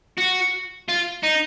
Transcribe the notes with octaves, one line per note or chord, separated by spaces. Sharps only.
F#4
F4
D#4